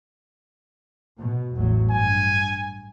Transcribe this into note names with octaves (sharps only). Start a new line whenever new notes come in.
B2
A1 E2 F#3
G2 G#5